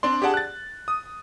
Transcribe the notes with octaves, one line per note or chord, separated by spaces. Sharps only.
C4 D4 D5 C6
G4 G#4 D5 F#5 A5
F#6 A6
D#6